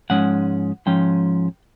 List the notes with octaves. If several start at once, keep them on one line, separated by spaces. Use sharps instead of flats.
G#2 F3 G#3 C#4 F#5
G#2 F3 G#3 C#4 G5